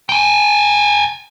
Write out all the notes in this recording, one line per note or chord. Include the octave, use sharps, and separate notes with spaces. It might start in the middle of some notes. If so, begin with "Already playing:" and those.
G5 G#5